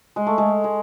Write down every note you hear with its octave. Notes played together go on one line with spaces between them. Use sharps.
G#3
A3
G#3
G#3